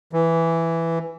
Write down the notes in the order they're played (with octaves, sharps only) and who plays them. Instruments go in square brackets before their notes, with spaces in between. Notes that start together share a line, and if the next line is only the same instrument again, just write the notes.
[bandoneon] E3